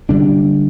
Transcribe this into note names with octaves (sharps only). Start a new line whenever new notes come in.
D3 G3 A#3 D4